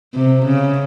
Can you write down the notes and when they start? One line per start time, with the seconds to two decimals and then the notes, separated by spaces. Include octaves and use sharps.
0.15 C3
0.46 C#3